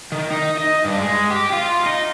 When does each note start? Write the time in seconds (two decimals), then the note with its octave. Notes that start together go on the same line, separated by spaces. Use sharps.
0.12 D#3
0.31 D#4
0.58 D#5
0.85 G2
0.99 G#3
1.30 G4
1.53 F4
1.86 D#4